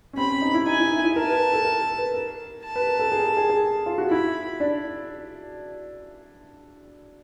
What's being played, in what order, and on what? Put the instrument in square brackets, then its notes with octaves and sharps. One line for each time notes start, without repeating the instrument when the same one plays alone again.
[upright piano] C#4
[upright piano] C4 [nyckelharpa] B5
[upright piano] C#4
D#4
E4
[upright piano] D#4 [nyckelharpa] G#5
[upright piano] E4
E4
[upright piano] A#4 [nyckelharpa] A5
[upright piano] B4
A#4
A4
A#4
A#4
B4
A#4
[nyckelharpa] A5
[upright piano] B4
A#4
A4
G#4
A#4
A4
G#4
G#4
F4
F#4
[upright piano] E4 [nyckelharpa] B5
[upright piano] D4